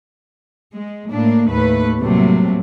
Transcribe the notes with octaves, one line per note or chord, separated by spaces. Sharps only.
G#3
A2 A#3 D4
D#2 A2 A3 B4
A2 C3 F#3 G3 A3 A#3